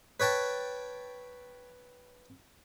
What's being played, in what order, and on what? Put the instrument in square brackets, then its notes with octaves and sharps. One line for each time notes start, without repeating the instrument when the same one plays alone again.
[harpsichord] B4 C#5 G5 A5